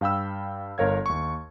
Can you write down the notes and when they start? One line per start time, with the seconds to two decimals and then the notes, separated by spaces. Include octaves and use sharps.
0.01 G2 F5 G5 B5 E6
0.78 G1 A#4 C#5 F5 G#6
1.06 D#2 C#6